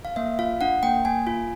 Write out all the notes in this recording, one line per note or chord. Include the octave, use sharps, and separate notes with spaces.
F5
A#3 E5
F4 F5
D4 F#5
A#3 G5
A#3 G#5
F4